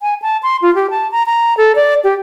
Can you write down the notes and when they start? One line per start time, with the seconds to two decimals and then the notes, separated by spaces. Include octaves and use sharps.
0.02 G#5
0.22 A5
0.43 C6
0.62 F4
0.75 G4
0.90 A5
1.12 A#5
1.26 A#5
1.57 A4
1.76 D5
2.04 G4